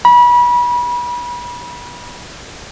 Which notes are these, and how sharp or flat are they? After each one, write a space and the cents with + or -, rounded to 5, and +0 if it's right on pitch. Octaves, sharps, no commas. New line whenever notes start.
B5 -30